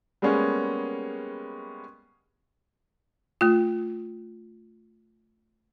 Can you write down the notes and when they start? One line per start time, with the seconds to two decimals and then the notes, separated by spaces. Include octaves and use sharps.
0.22 G3 G#3 A#3 B3 C#4 G#4
3.41 A3 F4